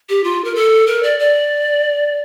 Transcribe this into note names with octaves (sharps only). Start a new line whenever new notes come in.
G4
F4
A#4
A4
A#4
D5
D5